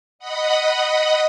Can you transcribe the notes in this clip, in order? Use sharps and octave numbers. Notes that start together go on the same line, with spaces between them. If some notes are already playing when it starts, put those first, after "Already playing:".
D#5 F#5 B5 D#6